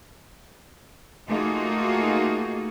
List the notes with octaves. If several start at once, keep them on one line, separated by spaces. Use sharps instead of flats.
A3 A#3 D#4 F4 F#4 G#4